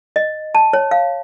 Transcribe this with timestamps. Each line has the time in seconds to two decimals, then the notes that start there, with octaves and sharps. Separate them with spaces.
0.16 D#5
0.55 A5
0.73 C#5
0.91 F5